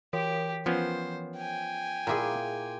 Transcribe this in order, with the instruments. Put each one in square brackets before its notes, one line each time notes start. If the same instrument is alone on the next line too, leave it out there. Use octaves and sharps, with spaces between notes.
[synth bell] E3 A#4 C#5 [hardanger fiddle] G4
[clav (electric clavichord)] F3 B3 C#4 [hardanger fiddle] C5
[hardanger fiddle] G5 G#5
[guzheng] A#2 E4 G#4 [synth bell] A#5 C6 D6